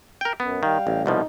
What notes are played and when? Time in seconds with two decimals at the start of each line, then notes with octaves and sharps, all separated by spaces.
0.21 A#4 G5
0.40 F#2 B3
0.63 D#3 G3 F5 G5
0.87 A1
1.06 C2 B2 F3 D#4